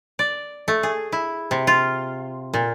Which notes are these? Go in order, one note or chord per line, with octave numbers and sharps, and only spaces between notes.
D5
A3
G#4
E4
C3
F4
A#2